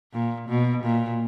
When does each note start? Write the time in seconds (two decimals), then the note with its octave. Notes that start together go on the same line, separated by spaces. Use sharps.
0.13 A#2
0.49 B2
0.84 A#2